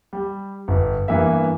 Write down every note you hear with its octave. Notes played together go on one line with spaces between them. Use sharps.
G3
G1
G2 E3 A#3 B3 E5